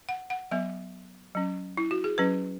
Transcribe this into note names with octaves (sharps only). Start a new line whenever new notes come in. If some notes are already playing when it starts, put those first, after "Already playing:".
F#5
F#5
F#3 B3 E5
F#3 C#4
E4
F#4
G#4
F#3 C#4 B4